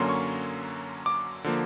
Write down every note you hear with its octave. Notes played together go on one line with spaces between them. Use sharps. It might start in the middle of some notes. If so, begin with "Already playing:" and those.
Already playing: F#2 D3 F#3 A#3 C#4 C6
C#6
D6
D3 F3 A#3